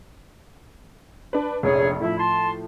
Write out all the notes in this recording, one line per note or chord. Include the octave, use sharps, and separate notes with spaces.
D4 B4
F1 A#1 C#4 G#4 C#5
A2 F3 E4
A5 C6